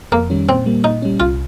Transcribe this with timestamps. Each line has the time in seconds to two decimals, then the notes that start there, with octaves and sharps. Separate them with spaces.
0.12 F2 A#3
0.30 D#3 G3 C#4
0.48 A#2 C4
0.66 G3 A#3
0.84 A#2 D#4
1.02 G3 C#4
1.20 C2 F4